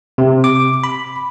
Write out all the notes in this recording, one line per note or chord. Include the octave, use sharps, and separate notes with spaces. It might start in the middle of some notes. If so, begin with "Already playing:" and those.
C3
D6
B5